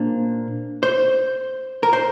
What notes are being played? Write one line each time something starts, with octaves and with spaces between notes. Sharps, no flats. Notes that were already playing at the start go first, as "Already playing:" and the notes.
Already playing: A#2 A#3 D4 C5
C5
A#4
C5